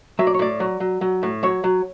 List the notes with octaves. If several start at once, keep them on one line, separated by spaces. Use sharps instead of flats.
F#3 E5
D5
C#5
A2 D5
F#3
F#3
F#3
A2
F#3 C#5
F#3